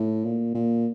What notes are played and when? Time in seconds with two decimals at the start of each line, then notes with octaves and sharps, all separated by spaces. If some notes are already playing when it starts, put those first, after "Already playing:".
Already playing: A2
0.25 A#2
0.54 A#2